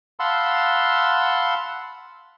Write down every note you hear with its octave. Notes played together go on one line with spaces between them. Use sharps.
F5 F#5 A5 B5 C6 E6